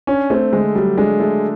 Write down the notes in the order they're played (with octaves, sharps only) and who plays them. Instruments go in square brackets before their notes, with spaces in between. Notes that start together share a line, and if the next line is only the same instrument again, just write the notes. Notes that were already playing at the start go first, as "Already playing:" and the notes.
[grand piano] C#4 [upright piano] D4
[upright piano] A3 [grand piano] C4
[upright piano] D3 [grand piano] G#3
[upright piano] F#3 [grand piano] G3
[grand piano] G#3 [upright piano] D4
[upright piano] A3